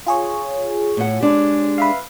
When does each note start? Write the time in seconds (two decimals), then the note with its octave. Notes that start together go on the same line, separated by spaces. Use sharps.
0.06 F4 G#4 C#5
0.97 A2 F#5
1.20 G#3 D4 G4
1.78 B4 E5 F5